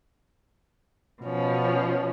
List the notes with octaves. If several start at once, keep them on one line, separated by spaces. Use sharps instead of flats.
B2 F3 C#4